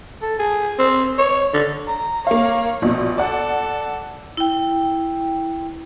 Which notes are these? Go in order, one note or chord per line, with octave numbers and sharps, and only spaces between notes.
A4
G#4
C4
C#5
D3
A#5
A#3 C#5 F5
A#1 B2
A4 D5 F#5
E4 G5